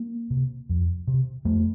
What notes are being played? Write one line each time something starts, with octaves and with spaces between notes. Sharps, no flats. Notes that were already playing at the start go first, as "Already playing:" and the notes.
Already playing: A#3
C3
F2
C3
F2 A3